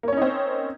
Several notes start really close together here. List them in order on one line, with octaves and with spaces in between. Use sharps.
A#3 C#5 C#4 D#4 C4